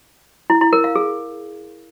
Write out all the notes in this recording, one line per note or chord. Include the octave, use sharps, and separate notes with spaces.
E4
E4
A#4
F5
G#4